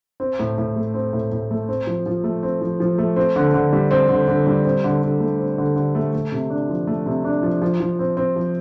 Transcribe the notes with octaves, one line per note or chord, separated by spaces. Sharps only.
C4
A2
A2
A3
C4
A2
A2
A3
C4
F3
F3
A3
C4
F3
F3
A3
C4
D3
D3
G3
C4
D3
D3
G3
C4
D3
D3
A3
C4
D3
D3
A3
A3
C3
D4
F3
A3
C3
D4
F3
F3
F3
C4
C4
F3